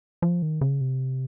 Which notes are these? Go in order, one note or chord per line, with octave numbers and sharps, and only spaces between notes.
F3
D#3
C#3
C3